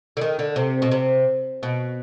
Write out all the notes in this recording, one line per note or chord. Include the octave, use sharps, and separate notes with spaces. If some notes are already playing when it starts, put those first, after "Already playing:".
D3
D#3
D3
C3
B2
C3
B2